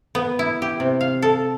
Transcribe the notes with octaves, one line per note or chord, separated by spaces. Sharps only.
B3
E4
G4
C3
F5
A4